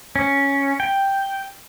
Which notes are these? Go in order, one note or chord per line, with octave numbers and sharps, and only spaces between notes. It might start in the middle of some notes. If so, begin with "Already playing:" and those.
C#4
G5